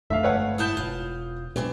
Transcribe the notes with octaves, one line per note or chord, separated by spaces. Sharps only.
E1 F2 D3 A3 E5 F5
G1 B4 C#5 F#5
B3 E4 A5 D#6 G6 G7
E1 F4
B1 B2 E3 C4 D4